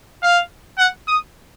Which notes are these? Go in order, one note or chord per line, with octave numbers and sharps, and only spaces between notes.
F5
F#5
D#6